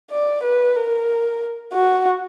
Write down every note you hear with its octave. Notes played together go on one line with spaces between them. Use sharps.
D5
B4
A#4
F#4